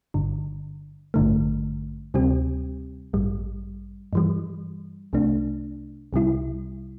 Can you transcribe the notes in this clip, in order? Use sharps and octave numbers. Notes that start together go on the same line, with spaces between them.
G1 G2 D3
A1 G2 D3 A3
D2 C3 G3 C4 G4
A1 G2 G3
G2 E3 G3
C2 C3 A3 D4
C2 C3 G3 E4